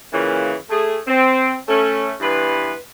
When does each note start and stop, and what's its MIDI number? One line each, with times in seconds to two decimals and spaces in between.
0.12 0.54 46
0.12 0.54 49
0.12 0.54 52
0.69 0.98 57
0.69 0.98 68
1.07 1.56 60
1.68 2.13 57
1.68 2.13 61
2.21 2.73 43
2.21 2.73 52
2.21 2.73 59
2.21 2.73 71
2.21 2.73 83
2.21 2.73 84